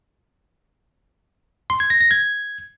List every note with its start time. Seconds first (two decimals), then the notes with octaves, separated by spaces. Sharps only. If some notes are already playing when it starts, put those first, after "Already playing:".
1.70 C6
1.80 G#6
1.90 A#6
2.01 A#6
2.11 G#6